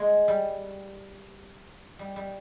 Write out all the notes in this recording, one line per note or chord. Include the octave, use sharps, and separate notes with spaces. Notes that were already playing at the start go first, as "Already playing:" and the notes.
Already playing: G#3
G3
G3
G3